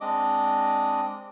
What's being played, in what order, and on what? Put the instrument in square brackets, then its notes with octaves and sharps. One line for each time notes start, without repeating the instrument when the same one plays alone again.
[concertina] G#3 C4 D4 D#5 D6